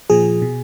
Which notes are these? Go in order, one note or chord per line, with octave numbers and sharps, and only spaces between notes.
A#2 F3 G#4
B2